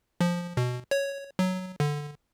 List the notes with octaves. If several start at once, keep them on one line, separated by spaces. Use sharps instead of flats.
F3
B2
C#5
F#3
D3